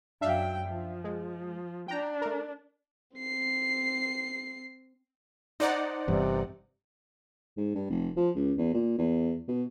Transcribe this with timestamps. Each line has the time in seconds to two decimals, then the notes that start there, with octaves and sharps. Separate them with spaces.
0.21 F#2 F#3 D4 E5 F5 G5
0.67 F3
1.04 G#3
1.88 D4 G5 A#5
2.22 A3 A#4
3.17 C4 C7
5.60 D4 D#4 C5 D5 D#5 F#5
6.08 G1 G2 C3 E3
7.57 G#2
7.75 G2
7.90 F1
8.16 F3
8.35 C#2
8.58 E2
8.74 A#2
8.98 E2
9.48 B2